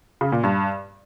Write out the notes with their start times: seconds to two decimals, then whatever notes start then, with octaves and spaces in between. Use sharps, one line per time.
0.21 C#3
0.32 A#2
0.44 G2